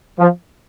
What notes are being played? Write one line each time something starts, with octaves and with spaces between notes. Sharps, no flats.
F3